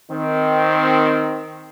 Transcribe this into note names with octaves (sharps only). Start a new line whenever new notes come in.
D#3 C4